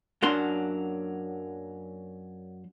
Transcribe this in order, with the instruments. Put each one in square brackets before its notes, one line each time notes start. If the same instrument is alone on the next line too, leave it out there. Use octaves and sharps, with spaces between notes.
[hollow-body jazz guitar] F#2 F#3 A#3 D4 C6